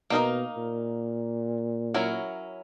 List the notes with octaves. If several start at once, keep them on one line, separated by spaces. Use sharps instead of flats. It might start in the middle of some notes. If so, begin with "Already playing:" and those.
B2 A#3 D#4 A#4 D#5
A#2
F#3 C#4 E4 A#4